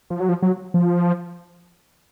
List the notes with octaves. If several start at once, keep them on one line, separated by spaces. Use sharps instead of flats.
F3
F#3
F3
F#3
F3